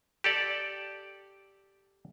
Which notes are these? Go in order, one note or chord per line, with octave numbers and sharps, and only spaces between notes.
G4 A4 D5